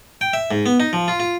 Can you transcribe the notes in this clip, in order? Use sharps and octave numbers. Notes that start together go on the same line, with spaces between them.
G5
E5
G#2
B3
D#4
F3
F4
F4